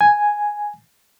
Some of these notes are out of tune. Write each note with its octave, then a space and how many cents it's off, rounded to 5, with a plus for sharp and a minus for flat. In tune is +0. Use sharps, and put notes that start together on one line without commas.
G#5 +0